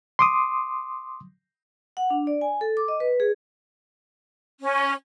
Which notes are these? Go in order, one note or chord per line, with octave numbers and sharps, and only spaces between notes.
C6 D6 D#6
F#5
D4
D5
G#5
A4
D6
D#5
B4
G#4
C#4